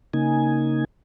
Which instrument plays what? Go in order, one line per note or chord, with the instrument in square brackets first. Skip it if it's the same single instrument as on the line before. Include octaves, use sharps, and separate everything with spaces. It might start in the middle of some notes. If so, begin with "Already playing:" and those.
[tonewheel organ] C#3 A#3 D#4 G#5